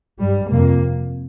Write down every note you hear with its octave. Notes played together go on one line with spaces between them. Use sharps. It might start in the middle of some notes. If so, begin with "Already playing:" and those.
G2 G3
F2 C3 A#3